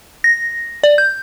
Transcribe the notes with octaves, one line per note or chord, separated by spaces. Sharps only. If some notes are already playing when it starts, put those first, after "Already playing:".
A#6
D5
G6